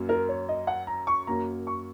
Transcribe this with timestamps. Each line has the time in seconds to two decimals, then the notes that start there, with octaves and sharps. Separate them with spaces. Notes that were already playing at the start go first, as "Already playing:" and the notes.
Already playing: F#2 F#3 A#3
0.09 A#4
0.29 C#5
0.49 D#5
0.67 F#5
0.87 A#5
1.07 C#6
1.27 F#2 F#3 A#3 A#5
1.67 C#6